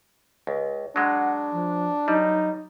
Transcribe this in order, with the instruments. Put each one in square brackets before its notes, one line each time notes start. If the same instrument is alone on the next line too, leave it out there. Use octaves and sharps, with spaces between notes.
[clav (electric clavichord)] C#2
[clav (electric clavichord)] F#3 G#3 [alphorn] D4 [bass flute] F#5
[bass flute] F3
[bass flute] F#3 [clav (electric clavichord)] G3 [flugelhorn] D#4